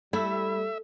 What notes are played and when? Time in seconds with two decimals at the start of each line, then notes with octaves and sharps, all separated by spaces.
0.13 G3 A3 E4 E5